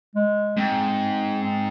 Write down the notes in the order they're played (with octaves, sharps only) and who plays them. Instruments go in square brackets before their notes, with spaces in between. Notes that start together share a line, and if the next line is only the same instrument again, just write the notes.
[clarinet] G#3
[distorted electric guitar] G#2 [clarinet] C4
[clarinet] C4